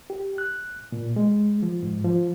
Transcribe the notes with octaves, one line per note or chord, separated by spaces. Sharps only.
G4
F#6
A#2
G#3
F3
G#2
F3